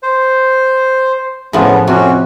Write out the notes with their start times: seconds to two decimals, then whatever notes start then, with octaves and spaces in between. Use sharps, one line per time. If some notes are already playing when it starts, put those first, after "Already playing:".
0.03 C5
1.53 A2 C#3 F3 B3
1.87 F2 C3 C#4 F#4